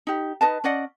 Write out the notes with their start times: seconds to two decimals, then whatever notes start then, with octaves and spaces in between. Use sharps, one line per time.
0.07 D#4 G4
0.41 D#4 B4 D#5 A5
0.64 C#4 D5 D#5 F#5